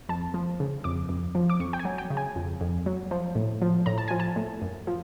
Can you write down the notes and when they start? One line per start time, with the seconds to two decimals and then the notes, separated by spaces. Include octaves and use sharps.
0.09 F2 A5
0.34 F3
0.60 C#3
0.84 F2 D6
1.09 F2
1.35 F3
1.50 D6
1.60 F2 C#6
1.73 G5
1.79 G#5
1.85 F#3
1.98 G5
2.10 C#3
2.17 G#5
2.36 F2
2.61 F2
2.86 F#3
3.11 F3
3.35 A2
3.62 F3
3.86 A2 A#5
3.98 A5
4.08 F3 G#5
4.20 A5
4.36 A2
4.62 F#2
4.87 F3